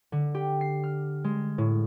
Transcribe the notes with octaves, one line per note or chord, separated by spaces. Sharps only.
D3
G4
C7
F6
G#3
A2